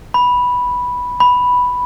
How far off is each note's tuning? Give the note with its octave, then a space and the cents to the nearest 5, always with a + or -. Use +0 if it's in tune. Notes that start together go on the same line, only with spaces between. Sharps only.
B5 -5
B5 +0